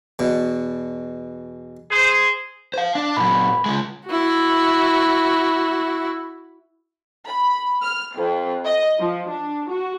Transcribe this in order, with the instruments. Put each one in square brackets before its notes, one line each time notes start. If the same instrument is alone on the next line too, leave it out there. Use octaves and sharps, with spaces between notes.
[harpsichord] E2 B2
[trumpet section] G#4 C5
[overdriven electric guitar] C5 F5
D4
[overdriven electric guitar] A#2 F#3 [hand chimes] B5
[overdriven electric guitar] C#3 G#3
[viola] E4 F#4
[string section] B5
F6
F2
D#5
F3
D4
F#4